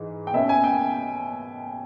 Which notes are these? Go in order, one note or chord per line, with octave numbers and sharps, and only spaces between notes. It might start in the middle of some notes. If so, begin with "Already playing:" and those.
Already playing: G#2 E3
G5
B2 A#3 C#4 E5
G#5
G5